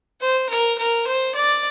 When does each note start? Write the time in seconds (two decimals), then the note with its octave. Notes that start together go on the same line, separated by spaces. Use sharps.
0.21 C5
0.50 A#4
0.78 A#4
1.07 C5
1.35 D5